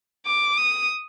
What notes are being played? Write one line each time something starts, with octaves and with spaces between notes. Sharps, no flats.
D6
D#6